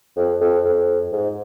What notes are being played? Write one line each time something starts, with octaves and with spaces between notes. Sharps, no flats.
F2
F2
F2
G#2